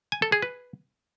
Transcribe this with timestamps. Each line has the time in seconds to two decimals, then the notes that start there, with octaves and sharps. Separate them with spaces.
0.12 G#5
0.22 A4
0.32 G#4
0.42 B4